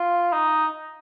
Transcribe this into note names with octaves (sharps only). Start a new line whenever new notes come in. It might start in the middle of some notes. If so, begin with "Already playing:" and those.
Already playing: F4
D#4